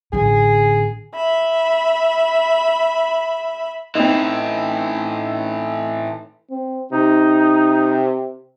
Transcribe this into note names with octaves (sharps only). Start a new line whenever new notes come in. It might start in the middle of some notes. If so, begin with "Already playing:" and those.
A1 D3 G#4
E5 B5
A2 E3 C4 D#4
C4
C3 D#4